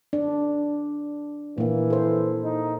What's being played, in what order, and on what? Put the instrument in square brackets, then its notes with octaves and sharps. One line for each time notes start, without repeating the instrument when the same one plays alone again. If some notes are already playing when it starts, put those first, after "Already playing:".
[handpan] D4
[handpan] A#2 A#3 [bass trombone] E3
[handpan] A4 C5
[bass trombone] D#4